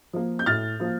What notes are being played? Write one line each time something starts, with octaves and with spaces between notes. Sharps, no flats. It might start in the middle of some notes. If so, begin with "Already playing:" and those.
F3 A#3
G6
A2 F6 A6
F3 A#3